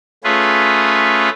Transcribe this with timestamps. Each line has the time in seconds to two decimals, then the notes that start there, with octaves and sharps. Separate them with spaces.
0.24 A3 C#4 F4 G#4 B4